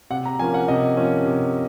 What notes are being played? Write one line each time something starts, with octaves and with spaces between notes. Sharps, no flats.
C3 F#5
A#5
F3 A#3 C#4 G#5
F#5
C3 D#5
F3 A#3 C#4
C3